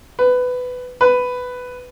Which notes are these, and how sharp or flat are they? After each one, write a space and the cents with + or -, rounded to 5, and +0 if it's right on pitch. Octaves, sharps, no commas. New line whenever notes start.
B4 +15
B4 +10